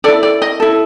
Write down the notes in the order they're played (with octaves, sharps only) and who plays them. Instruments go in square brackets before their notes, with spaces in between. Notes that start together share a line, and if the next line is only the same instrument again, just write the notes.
[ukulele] E4 A4 D5
D5
D#5
E4 A4